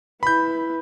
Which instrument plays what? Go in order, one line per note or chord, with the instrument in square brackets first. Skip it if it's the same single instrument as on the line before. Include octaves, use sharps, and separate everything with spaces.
[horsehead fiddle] E4 B4 [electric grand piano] B5 G6